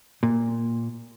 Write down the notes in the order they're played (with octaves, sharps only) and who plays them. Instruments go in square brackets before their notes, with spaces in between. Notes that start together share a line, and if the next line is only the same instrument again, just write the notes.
[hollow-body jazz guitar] A#2